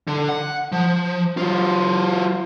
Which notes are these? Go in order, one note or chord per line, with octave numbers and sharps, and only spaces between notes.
D3
F#5
F3
F#3 F4